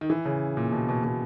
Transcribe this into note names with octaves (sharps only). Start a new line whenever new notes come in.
D#3
E3
C#3
A#2
B2
B2
B2